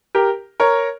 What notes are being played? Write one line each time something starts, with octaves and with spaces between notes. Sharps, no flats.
G4 A#4
A#4 C#5